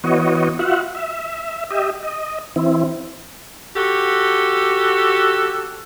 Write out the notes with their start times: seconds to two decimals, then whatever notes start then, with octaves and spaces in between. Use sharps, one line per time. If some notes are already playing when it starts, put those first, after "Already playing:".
0.04 E3 B3 F#4 C#5 D#5
0.59 F4 F#4 E5 F#5
0.95 E5
1.71 G4 D#5 E5
2.03 D#5
2.56 E3 C4 E4
3.75 F#4 G4 A4